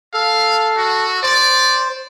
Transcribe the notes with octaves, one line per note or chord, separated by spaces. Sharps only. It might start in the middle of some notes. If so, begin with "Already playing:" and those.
A4 F5
F#4
C5 D5